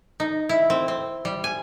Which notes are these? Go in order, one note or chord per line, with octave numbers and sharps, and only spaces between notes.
D#4
E4
C4
C4
G3
G#5